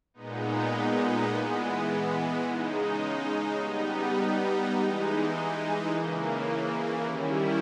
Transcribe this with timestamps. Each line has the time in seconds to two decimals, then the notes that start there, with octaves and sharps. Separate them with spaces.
0.14 A#2 G#3 B3 D#4
1.29 E3 G#3 B3
2.44 C#3 G#3 D#4
3.59 G3 B3 D#4
4.73 E3 G#3 D#4
5.89 C#3 E3 A#3
7.03 D#3 G3 C#4 E4